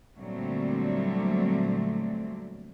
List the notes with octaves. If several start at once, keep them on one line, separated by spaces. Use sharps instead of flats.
A#2 D3 F#3 G3 A3 C4